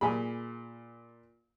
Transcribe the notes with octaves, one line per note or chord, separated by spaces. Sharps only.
A#2 G#4 G#5 B5